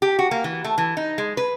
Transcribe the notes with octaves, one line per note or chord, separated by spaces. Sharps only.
G4
F#4
A#3
E3
A3
E3
D#4
G#3
B4